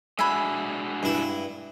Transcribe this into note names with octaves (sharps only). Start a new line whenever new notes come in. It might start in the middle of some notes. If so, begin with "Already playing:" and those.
G#3 D4 F#4 E5 G#5 B5
G2 E4